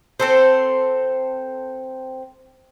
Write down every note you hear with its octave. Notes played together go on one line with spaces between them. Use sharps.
C4 A4 C5